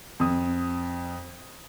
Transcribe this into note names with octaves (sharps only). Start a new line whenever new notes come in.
F2 D#6